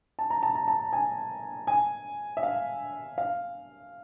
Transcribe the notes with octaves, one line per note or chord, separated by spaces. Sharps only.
A5
A#5
A5
A#5
A5
G#5
G#5
E5
F5
F5